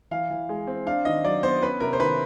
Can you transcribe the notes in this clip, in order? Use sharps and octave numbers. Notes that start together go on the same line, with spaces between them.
E3 F5
E3
G#3
C4
D4 F5
D#3 D#5
F#3 D5
B3 C5
C#4 B4
C3 A#4
C5
D#3 B4